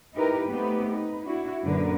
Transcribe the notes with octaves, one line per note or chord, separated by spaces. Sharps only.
D#4 E4 G4 A#4 B4
A3 B3 C4 D#4 G4 B4
D#4 B4
D4 E4 F#4
F#2 A#2 D3 A#4 B4